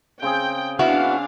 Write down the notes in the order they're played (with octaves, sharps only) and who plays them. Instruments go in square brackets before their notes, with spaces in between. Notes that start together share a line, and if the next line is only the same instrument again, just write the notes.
[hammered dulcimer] C#3 C4 G#4 [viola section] G5
[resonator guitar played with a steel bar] B3 E4 F#4 [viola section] D4 F5